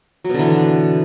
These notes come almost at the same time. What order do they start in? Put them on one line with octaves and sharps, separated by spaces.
F#3 B2 D3 E3